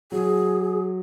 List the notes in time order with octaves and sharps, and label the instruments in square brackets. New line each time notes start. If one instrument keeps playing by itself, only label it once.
[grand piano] F#3 [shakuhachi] G#4